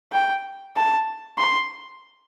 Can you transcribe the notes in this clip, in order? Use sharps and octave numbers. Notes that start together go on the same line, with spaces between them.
G5
A5
C6